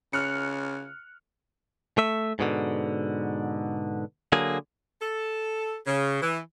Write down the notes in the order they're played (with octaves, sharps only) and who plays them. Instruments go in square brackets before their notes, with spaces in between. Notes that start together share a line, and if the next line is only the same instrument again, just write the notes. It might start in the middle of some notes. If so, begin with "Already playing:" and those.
[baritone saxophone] C#3 [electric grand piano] F6 F#6 C#7
[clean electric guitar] A3 E5
G#2 B2 D3
D3 F#3 A#3 G#4
[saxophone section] A4
C#3
E3